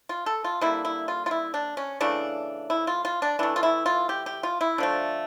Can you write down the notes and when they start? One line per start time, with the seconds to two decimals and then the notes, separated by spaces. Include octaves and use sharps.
0.09 F4
0.26 A4
0.44 F4
0.61 D3 G3 A#3 E4
0.85 E4
1.08 F4
1.26 F4
1.31 E4
1.54 D4
1.77 C#4
2.00 C#3 E3 A3 D4
2.70 E4
2.87 F4
3.05 F4
3.22 D4
3.39 E3 A3 D4
3.56 F4
3.63 E4
3.86 F4
4.09 G4
4.26 G4
4.43 F4
4.61 E4
4.78 D3 F3 A3 D4